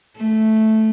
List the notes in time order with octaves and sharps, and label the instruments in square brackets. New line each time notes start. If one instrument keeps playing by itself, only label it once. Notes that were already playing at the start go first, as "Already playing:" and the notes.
[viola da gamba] A3